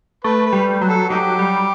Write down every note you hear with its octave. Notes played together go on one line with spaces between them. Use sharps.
A3 B4
B4
G3
F#3
A4
F#3 D#4 G4
G3